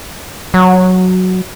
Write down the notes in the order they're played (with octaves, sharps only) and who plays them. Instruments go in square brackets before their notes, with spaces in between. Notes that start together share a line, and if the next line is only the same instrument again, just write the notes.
[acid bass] F#3